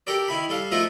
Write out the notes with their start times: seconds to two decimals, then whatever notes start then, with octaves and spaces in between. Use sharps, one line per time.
0.07 G4 A4 A#4 D5
0.28 D#3 E4 B5
0.49 G3 A4 F5
0.71 F3 A3 D#4 F4 A#4 E5